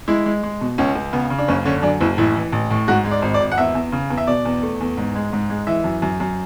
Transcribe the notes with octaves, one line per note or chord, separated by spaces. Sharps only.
G#3 E4
G#3
G#3
B2
C#2 C#4
C#2
C#3 B3
C#3
D4
F#1 C#4
D3 C#4
F#2 D4
F#1 E4
A1 E4
E3
A1
A2
G#2 F#4
G#3
D5
G#1
D5
G#1
F#5
E2 E5
E2
C#3
E2
E5
B2 D5
E2
A3
E2
G#2
G#3
G#2
G#3
E3 E5
F#2
F#2
F#2